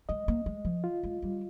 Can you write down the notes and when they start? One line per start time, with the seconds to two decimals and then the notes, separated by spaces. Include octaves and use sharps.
0.09 G#3 D#5
0.28 A#3
0.46 G#3
0.65 F3
0.84 F4
1.03 G#3
1.22 G3